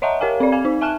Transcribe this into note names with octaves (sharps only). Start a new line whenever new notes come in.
C#5 D#5 E5 F#5 A5 A#5
G4 A#4 C#5 F5 G#5
C4 D5
F5 G#5 G#6
D#4
E5 G#5 A5 F6 F#6 E7